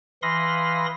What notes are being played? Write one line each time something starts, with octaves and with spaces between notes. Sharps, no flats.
E3 F5 B5 C6 D#6 A#6